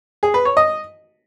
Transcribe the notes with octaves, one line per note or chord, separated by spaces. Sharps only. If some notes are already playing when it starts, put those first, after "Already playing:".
G#4
B4
C#5
D#5